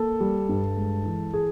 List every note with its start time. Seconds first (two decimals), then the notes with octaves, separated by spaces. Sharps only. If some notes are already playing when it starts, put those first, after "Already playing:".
Already playing: A#3 A4
0.20 G3
0.49 G2
0.77 G#3
1.06 E3
1.34 G#4